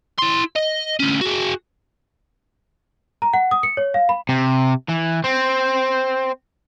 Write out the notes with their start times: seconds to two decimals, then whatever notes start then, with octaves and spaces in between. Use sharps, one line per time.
0.18 E4 C6
0.56 D#5
1.00 D2 C#4
1.21 F#4 G#4
3.22 A#5
3.34 F#5
3.51 D#6
3.63 C#7
3.77 C#5
3.94 F5
4.09 B5
4.29 C3
4.89 E3
5.24 C4